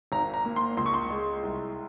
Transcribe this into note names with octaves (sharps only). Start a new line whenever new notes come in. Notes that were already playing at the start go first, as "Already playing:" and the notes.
G#1 A#5
A#5
A#3
C6
C#2 C6
C#6
C6
G#3
C2